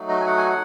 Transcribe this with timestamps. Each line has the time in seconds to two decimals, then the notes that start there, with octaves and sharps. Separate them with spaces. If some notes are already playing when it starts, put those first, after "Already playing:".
Already playing: F#3 A3 D#4 F#4
0.09 D#5
0.21 G#5
0.26 F#5
0.37 G#5
0.49 F#5